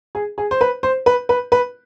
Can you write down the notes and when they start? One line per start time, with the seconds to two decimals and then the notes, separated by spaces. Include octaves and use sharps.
0.15 G#4
0.38 G#4
0.51 C5
0.61 B4
0.83 C5
1.06 B4
1.29 B4
1.52 B4